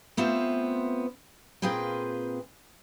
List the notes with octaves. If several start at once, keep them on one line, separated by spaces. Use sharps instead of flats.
A3 B3 C4 F4 C5 E5
A#2 C4 F4 G#4 B4 G5